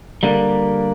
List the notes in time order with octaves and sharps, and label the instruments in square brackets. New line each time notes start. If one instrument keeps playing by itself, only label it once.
[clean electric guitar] D3 G3 A#3